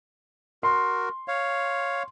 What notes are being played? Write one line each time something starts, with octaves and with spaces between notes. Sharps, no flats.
F#4 A#4 C6
C#5 F5